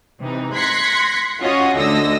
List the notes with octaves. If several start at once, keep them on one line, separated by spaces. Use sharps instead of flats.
C3 E3 D#4
C6 F#6 G#6 A#6 B6 C#7
C#4 F4 F#4 C#5 D#5 F#5
D2 D3 D#5 E6 A#6